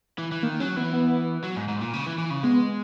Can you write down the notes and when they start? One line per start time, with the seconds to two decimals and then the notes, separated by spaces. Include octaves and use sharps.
0.18 E3
0.32 E3
0.43 D#3 A#3
0.60 F#3 C#4
0.77 E3 B3
0.93 B3
1.44 F#3
1.56 G#2
1.68 G#2
1.81 A#2
1.93 C#3
2.06 E3
2.18 E3
2.31 C#3
2.43 G#3 B3